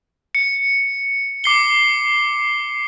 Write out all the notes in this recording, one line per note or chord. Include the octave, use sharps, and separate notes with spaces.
C#7
D6 C7 G7